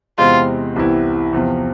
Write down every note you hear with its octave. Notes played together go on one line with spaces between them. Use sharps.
E2 C3 G#3 C4 E4 F4
C2 C3 E3 B3 E4
E2 C3 F3